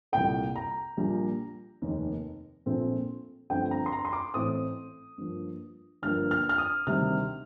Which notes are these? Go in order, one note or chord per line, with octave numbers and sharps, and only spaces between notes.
C2 A#2 A3 G5
A#5
A#1 A#2 G3
F1 D#2 D#3
A#1 A#2 A3 C4
G1 G2 F3 A3 C4 G5
A#5
C6
A#5
C6
D6
A1 A2 A3 C4 D#6
G2 F3 A#3
G1 G2 F3 A#3 F6
F6
F6
D#6
D2 C3 D#3 G3 F6